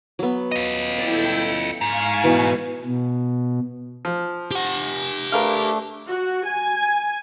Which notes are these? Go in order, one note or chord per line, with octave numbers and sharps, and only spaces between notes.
F#3 B3
F4 D#5
E4 A4 D5 G5
C#7
G#2 F5 G#5 C#6
B2 E3 B4
B2
F3
G4 F#5
A3 D4 A#4 B4 F5
F#4
G#5